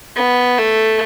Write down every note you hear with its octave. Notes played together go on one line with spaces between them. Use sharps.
B3
A3